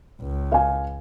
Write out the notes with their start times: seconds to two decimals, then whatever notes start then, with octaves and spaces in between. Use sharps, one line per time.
0.21 C#2
0.52 F5 G#5